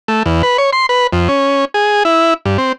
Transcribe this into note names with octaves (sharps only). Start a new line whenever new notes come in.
A3
E2
B4
C#5
C6
B4
F2
C#4
G#4
E4
G2
C4